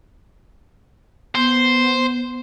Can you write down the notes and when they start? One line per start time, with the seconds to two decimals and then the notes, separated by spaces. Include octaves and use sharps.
1.35 B3 C5